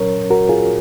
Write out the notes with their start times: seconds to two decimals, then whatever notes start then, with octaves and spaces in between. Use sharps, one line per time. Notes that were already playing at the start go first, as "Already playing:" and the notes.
Already playing: A#2 F#3 C#4 A#4 C#5
0.30 F#4 A#4
0.49 F4 G#4